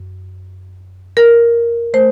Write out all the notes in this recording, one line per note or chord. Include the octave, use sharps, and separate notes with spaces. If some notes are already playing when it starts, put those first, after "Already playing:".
Already playing: F#2
A#4
A3 C5